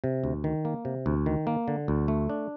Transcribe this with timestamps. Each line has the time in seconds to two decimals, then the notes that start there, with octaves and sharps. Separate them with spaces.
0.04 C3
0.24 D2
0.44 D#3
0.65 A#3
0.85 C3
1.06 D2
1.26 D#3
1.47 A#3
1.68 D3
1.88 D2
2.08 A3
2.30 D4